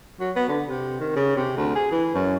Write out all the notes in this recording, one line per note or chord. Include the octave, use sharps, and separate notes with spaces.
F#3
B3
D3
C3
D#3
C#3
C3
D2
G#4
E3
F#2